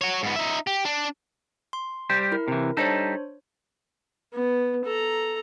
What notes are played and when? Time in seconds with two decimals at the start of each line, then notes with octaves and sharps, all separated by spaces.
0.01 F#4 C#5
0.23 G#2 B3
0.36 D#4 E5
0.67 G4
0.85 D4
1.73 C6
2.10 G3 G4 C5
2.32 E4 A#4
2.48 C3 E3
2.77 G3 D4 D#4 A4 C5 C#5
4.33 B3
4.85 A4 A#5